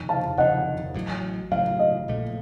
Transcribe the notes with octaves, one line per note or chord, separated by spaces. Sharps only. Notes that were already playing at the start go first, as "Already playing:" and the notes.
Already playing: F1 F2 D#3
F5 A5
F1 F2 D#3 D#5 F#5
A1 A2 F#3
A1 A2 F#3 F5
D#5
A#1 A#2 A3